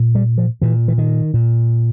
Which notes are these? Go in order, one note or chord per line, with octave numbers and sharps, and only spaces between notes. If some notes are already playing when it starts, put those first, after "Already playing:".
Already playing: A#2
G3
F3
A#2 E3
E3
D#3
A#2